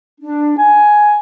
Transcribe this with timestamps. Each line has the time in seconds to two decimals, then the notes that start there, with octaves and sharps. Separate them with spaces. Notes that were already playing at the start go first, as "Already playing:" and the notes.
0.21 D4
0.57 G#5